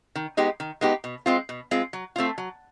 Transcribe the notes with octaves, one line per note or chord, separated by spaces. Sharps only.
D#3
G#3 B3 D#4 G4
D#3
G#3 B3 D#4 G4
B2
G#3 C4 F4
B2
G#3 C4 F4
F#3
A3 C4 F4
F#3